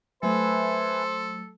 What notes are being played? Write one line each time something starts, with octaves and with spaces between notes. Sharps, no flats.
F#3 A3 A4 B4 C5 E5 G#5